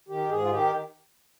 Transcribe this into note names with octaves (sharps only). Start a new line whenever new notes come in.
D#3 G4
G#2 G#4
F4
D#3 G4